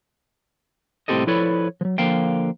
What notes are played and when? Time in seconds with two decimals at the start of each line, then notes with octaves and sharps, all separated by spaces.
1.08 C2 A2 C4 G4 A4 D#5
1.27 F3 E4 A4 B4 C#5 D5
1.81 F3 F#3
1.98 D3 F3 A#3 F5 G5